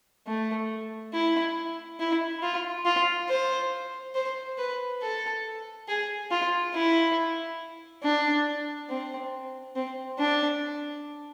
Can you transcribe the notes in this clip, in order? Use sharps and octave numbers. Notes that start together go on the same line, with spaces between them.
A3
E4
E4
F4
F4
C5
C5
B4
A4
G#4
F4
E4
D4
C4
C4
D4